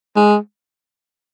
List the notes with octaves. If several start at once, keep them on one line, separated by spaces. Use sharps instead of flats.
G#3